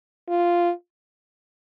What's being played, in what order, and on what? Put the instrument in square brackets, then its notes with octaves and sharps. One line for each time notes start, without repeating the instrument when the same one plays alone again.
[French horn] F4